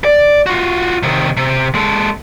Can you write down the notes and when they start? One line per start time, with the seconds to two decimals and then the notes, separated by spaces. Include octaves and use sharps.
0.05 D5
0.46 F4 F#4
1.03 C3 D#3
1.37 C3
1.75 G#3 A4